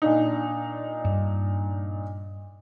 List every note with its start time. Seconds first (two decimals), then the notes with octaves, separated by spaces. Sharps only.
0.02 A#2 D4 D#4
1.05 G2